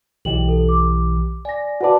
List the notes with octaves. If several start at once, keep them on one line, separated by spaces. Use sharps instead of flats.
B1 E3 G4 D#5 G5 F#7
A4
D6
D5 G#5 A#6
F#4 B4 D5 F#5 A5